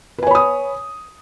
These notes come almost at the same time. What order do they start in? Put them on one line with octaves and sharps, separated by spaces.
B4 G#5 C#5 B5 D#6